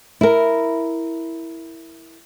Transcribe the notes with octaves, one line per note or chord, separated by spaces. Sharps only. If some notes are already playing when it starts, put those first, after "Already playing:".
E4 A#4